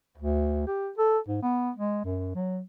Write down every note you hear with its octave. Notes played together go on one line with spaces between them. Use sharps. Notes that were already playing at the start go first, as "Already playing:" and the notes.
D2
G4
A4
G#2
B3
G#3
F#2
F#3